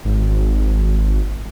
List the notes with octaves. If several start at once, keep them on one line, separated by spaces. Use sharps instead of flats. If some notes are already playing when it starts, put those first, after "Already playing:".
G#1